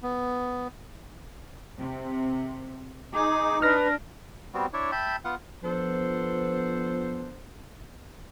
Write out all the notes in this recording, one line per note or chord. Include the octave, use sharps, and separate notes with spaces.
B3
C3
D#4 G#4 D6
D4 B4 F6 A#6
G3 B3 C4 F#4
D4 E4 C#5
E5 G5 A5 B5
B3 F4 F#5
F3 B3 D4 A4 C5